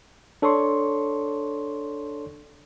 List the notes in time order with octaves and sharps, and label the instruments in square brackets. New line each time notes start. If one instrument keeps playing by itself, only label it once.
[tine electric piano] D4 A4 C#5 D5 C6 C#6